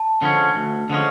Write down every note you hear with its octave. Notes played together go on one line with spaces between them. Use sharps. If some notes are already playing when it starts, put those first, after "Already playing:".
Already playing: A5
D3 F3 G#3 C#4
D2
D3 F3 G#3 C#4